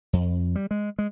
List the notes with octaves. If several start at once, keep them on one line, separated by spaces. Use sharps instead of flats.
F2
G3
G#3
G#3